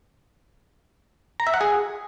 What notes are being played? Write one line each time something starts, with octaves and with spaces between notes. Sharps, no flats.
A#5
E5
F#5
G#4